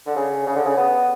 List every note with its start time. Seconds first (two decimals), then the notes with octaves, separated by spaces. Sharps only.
0.07 D3
0.16 C#3
0.47 C#3
0.56 D3
0.65 C#3
0.77 B3